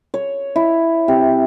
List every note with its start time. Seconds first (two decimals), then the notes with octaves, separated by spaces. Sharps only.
0.14 C#5
0.56 E4
1.08 C3